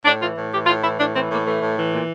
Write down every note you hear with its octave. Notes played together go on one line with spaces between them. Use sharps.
A2 D4
E3 F4
A2
E3 G4
A2 F4
E3 E4
A2 D4
E3 C4
A2 A#3
E3 A3
A2
E3
A#2